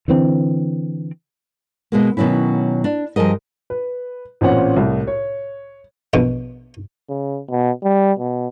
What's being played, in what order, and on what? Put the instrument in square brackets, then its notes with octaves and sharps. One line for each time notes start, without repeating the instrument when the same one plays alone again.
[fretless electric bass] D3 E3 C4
[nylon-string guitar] B2 G#3 A#3
B2 D#3 F#3 C#4 E4
D4
G2 F3 G#4 A#4 D#5
[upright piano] B4
A1 A#2 C4 C#4 F#5
C2 A2
C#5
[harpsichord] A#1 B2
[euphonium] C#3
B2
G3
B2